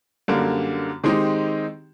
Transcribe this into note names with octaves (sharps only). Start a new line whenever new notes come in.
F#2 D3 G3 A#3
D#3 G#3 C4 D#4 G4